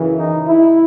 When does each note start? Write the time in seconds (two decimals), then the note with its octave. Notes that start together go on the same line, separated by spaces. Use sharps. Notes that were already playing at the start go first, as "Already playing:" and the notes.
Already playing: F#2 C#3 E3
0.18 D#4
0.48 E4